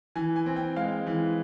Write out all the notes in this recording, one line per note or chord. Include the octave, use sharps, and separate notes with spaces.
E3 G#5
G#5
C4
G5
G#3 F5
E3